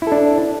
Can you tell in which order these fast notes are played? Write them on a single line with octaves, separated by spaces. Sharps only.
E4 A4 D4